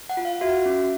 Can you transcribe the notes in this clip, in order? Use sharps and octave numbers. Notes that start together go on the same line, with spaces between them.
F#5
F4
F5
F#4 E5
C#4